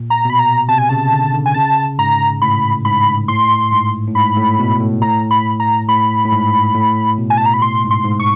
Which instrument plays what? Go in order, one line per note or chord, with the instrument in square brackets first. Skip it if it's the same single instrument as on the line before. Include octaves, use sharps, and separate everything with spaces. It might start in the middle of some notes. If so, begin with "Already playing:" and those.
Already playing: [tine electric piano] A#2
[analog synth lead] A#5
[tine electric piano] B2 [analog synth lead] B5
[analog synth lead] A#5
[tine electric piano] C3 [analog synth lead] A5
[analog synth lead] G#5
[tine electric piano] C#3 [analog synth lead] A5
[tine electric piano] D3
D3
[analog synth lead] G#5
[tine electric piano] C#3 [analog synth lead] A5
[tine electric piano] G#2 [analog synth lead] A#5
[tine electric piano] A2 [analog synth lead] B5
[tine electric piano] G#2 [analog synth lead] B5
[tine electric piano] A2 [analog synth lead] C6
[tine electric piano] G#2
A2
[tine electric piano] G#2 [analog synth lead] B5
[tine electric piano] A2
B2
A2
[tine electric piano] A2 [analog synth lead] A#5
[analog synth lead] B5
A#5
[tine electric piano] A2 [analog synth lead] B5
[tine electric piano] A2
G#2
A2
B2
[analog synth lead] G#5
A5
A#5
B5
[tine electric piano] A2 [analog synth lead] C6
[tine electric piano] G#2
[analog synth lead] C6
[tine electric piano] G#2
[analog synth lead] C#6